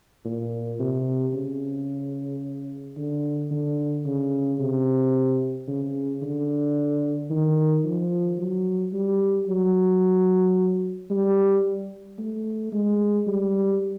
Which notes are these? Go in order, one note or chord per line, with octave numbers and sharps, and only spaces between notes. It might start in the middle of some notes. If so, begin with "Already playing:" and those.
A#2
C3
C#3
D3
D3
C#3
C3
C#3
D3
D#3
F3
F#3
G3
F#3
G3
A3
G#3
G3